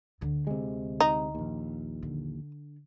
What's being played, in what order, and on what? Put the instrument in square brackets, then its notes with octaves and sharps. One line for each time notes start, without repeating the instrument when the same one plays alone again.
[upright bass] D2 D3
[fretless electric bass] C3 G#3
[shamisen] D#4
[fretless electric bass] A#1 D#2
[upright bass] D3